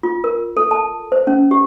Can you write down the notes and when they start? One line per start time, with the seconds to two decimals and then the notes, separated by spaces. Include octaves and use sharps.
0.03 F4
0.24 A#4
0.57 A4
0.71 A5
1.12 C5
1.27 C#4
1.51 G4